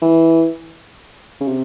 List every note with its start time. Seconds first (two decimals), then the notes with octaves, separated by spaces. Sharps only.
0.02 E3
1.41 C#3
1.48 C3